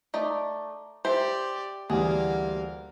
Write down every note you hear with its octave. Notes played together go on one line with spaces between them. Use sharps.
A3 D#4 D5
G4 C5 D5 E5
D2 E3 G3 A#3 G#4 F5